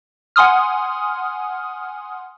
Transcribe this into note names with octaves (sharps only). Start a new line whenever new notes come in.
F#5 G#5 C6 D#6 F6